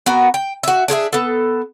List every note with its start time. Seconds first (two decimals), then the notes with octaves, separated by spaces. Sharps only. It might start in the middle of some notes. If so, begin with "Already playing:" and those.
0.06 B3 F#4 A#4
0.34 G5
0.63 F#4 E5
0.88 D4 G#4 B4 E5
1.13 B3 A4